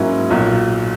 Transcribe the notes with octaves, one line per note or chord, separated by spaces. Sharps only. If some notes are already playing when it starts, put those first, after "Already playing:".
Already playing: G#2 F#3 A#3 C#4 E4
B1 A#2 F#3